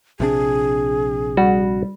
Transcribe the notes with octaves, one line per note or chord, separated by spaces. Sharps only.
A#1 C3 D4 G#4
G3 F#4